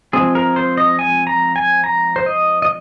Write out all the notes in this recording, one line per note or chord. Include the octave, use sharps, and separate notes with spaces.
F3 G#3 C4 G#4
A#4
C5
D#5
G#5
A#5
G#5
A#5
C5
D#5
D#5